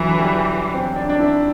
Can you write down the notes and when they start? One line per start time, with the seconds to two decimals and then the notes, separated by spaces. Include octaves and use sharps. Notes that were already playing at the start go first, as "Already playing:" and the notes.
Already playing: D3 E3 F#3
0.19 G3
0.74 C4
0.96 D4
1.09 D4
1.19 E4